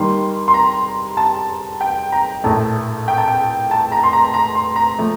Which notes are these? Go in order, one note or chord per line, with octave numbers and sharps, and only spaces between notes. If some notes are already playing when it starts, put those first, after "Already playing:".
Already playing: D#2 D#3 G3 C6
C6
A#5
A5
G5
A#5
A#1 A2 A3 A5
G5
A5
G5
A5
A#5
C6
A#5
A#5
C6
A#5
F3 A3